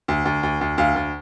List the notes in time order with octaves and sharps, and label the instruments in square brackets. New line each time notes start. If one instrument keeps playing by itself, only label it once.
[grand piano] D2
D2
D2
D2
D2 F5
D2